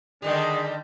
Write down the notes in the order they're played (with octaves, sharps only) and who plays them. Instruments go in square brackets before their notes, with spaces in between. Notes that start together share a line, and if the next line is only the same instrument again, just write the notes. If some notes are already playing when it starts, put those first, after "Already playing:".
[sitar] D3 D#3 G3 [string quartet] D4 D#5 G5 [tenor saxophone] G#4